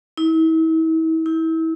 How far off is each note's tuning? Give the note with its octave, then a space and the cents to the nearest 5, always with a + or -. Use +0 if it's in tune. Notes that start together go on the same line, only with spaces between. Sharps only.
E4 -40
E4 -30